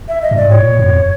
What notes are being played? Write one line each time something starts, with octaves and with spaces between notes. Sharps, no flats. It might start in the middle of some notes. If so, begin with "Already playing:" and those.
E5
D#5
G2
G#2 D5
A2 C#5
A#2
F#2
F2